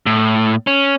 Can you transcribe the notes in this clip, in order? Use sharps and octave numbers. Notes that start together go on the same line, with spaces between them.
A2
C#4